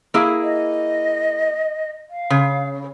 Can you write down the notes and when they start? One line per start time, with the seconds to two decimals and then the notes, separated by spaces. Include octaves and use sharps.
0.14 A#3 E4 G#4
0.42 D#5
2.10 F5
2.30 C#3